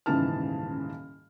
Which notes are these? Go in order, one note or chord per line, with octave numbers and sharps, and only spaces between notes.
D#1 G#2 C#3 E3 A5 F6